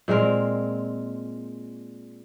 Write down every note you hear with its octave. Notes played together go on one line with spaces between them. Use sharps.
A#2 G#3 C4 A#4